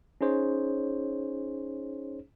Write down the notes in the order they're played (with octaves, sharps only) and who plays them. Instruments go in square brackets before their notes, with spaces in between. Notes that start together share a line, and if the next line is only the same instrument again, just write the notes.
[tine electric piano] C#4 D#4 G#4 C5 C#5